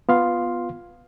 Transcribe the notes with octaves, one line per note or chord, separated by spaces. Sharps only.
B3 F4 F5 C6